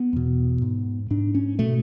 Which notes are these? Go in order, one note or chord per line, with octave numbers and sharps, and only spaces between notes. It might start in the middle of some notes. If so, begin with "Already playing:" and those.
Already playing: B3
E2 B2
G#2
G#2 D4
C#4
B2 A3